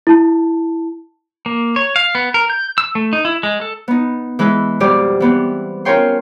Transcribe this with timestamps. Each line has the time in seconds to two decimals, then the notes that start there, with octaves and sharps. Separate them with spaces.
0.07 E4 A5
1.46 A#3
1.76 C#5
1.96 F5
2.15 B3
2.34 A#4
2.50 G6
2.78 E6
2.95 A3
3.13 D#4
3.25 E4
3.43 G#3
3.61 A4
3.88 B3 D#4
4.39 E3 G#3 E4 B4
4.80 F2 B2 G3 G4 D5
5.20 E3 B3 C4
5.85 C#4 F4 A#4 C#5 G5 C6